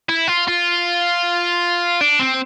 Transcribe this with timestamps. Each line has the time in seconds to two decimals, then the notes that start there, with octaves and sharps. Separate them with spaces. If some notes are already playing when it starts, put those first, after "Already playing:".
0.09 E4
0.28 F4
0.48 F4
2.01 D4
2.19 C4